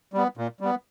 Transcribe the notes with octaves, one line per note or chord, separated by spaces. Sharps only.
G3 B3
A#2
G3 B3